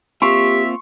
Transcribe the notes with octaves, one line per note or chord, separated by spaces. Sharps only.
A#3 C4 F4 G4 E5 C6 C#6